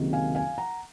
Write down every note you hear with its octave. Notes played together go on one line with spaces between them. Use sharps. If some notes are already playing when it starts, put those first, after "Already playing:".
Already playing: C#2 C3 D#3 F#3 A#3
F5 G#5
F5 G#5
F#5 A#5